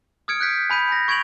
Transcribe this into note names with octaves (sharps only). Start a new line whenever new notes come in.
D#6 F6 G#6 C#7 D7
F#6 G6 B6
G#5 B5 G6 D#7
A#6
C#6 G#6 D7 F7 F#7